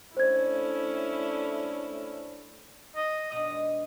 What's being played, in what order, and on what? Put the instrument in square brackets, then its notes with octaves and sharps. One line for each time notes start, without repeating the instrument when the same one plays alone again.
[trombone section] A3 D4 [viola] C#4 E4 [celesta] C5 G#6
[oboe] D#5
[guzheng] B2 D4 [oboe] D#6
[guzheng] G#3